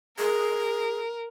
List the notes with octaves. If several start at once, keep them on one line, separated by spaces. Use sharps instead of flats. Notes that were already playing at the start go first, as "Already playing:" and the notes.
G#4 A#4